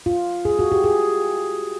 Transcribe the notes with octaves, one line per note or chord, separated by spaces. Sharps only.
F4
G#4
F#4
G4
G#4